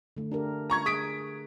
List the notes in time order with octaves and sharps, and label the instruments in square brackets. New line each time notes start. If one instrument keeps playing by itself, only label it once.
[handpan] D3 A3
D4 G4 A#4
[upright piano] A#5 C#6 G#6
[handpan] G#4 [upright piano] D#6 B6 D7